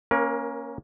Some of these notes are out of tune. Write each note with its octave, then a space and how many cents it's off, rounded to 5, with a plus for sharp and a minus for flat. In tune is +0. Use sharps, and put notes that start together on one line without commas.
A#3 +0 C#4 -5 A#4 +30